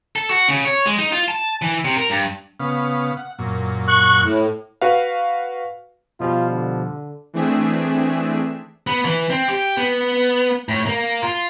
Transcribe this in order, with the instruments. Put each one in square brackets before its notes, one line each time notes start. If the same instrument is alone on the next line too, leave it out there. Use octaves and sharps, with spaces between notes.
[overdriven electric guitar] A4
F#4
C#3
C#5
G#3
D#4
F4
A5
E3
C3
A#4
G2
[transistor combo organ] C#3 B3 F5
F#5
F#2 A#2
[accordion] C#6 F#6
A2
[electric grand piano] F#4 B4 F5
[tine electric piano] B2 F3 G3 [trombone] F4
[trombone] D3
[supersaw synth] E3 A3 C4 D4 G#4 E5
[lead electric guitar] B3
E3
C4
G4
B3
A2
A#3
F4